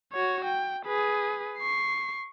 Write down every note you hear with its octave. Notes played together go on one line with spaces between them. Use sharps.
F#4 C#5
G5
G#4 B4
C#6 C7